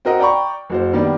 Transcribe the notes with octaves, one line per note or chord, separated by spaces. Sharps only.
C4 F#4 A#4 D#5 F#5
D5 G5 A#5 B5 C#6
F#1 F#4 C5
D#3 G3 A#3 B3 D4